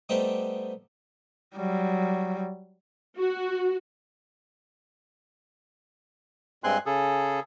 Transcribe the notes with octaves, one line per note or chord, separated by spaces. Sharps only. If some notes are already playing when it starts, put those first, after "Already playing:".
G3 A3 B3 C4 D#4 G4
F#3 G3
F#4
G2 G#3 C4 G#5 C6 F#6
C#3 G#4 A4